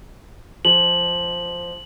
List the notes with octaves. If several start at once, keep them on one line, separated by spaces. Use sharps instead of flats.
F3 F#7